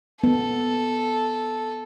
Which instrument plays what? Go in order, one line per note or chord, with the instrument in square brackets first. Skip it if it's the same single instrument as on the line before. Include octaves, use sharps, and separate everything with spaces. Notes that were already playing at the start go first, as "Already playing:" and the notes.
[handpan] B3 [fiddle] A4